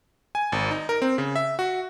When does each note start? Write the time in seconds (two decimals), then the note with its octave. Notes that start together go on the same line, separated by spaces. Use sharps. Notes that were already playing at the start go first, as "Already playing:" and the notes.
0.35 G#5
0.52 G#1
0.71 D#4
0.89 A#4
1.02 C4
1.18 C#3
1.36 E5
1.59 F#4